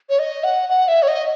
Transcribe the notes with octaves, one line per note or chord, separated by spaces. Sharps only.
C#5
D#5
F#5
F#5
E5
C#5
D#5